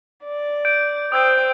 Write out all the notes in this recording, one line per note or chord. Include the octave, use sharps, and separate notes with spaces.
D5
G6 D7
C5 G5 D#6 E6 G6